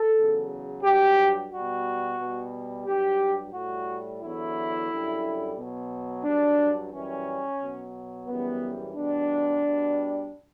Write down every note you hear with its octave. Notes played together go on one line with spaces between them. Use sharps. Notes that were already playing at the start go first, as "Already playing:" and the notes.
Already playing: A4
E2 C#3 F#3
G2 F#3 G4
B2 G3 F#4
B2 G3
G2 F#3 G4
A2 G3 F#4
E2 D3 F#3 E4
F#2 D3 G3
B2 F#3
G2 F#3 D4
F#2 E3 G3 C#4
B2 F#3
F#2 C#3 E3 G3 B3
E2 B2 G3 D4
B2 G3